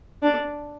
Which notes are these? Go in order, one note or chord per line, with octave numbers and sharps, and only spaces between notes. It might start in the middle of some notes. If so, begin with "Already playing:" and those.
D4